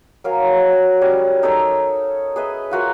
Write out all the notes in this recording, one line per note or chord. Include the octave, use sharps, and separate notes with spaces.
F#3 A#4 F5 G#5
G#5
G3 C#4
D#4 A4 A#4 C#5
G#4 B4 D#5 E5
F4 F#4 A#4